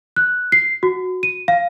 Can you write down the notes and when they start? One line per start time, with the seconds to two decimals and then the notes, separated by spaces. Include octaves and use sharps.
0.16 F#6
0.52 C7
0.83 F#4
1.23 D#7
1.48 F5